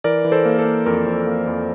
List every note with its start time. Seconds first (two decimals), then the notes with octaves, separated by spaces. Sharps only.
0.04 E3 A#4 D5
0.25 E3
0.32 A4 C5
0.45 A#3
0.59 A4
0.65 A#3
0.86 F2 A#4
1.06 F2
1.13 A4
1.27 A#3
1.48 F2